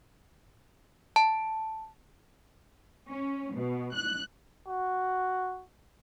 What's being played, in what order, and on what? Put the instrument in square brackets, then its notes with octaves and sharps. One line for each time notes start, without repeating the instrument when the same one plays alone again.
[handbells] A5
[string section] C#4
B2
F#6
[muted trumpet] F#4